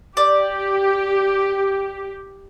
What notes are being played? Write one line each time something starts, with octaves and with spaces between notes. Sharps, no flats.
G4 D5